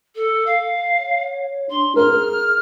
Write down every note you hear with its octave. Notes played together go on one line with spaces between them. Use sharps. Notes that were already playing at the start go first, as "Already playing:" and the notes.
A4
F5
C#5
D4 C6
G#4 A#4 F6